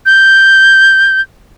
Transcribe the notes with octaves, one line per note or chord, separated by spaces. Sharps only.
G6